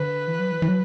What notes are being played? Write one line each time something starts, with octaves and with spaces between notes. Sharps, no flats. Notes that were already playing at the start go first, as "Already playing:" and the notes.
Already playing: D3 B4
E3
F#3
E3
E3
F#3